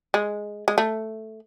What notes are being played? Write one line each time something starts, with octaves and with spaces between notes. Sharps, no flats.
G#3
G#3
A3